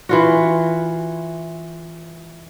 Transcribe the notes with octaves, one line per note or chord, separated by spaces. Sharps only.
E3 F4 F#4